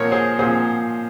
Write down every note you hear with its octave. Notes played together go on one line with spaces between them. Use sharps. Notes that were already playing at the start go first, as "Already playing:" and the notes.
Already playing: A#2 F3 A#4 C#5
G#4 C5
A#2 F3 G#4 C5